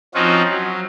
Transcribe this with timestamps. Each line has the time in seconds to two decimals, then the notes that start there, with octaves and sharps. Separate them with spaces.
0.14 F3 C4 C#4 D#4 F4 F#4
0.49 F#3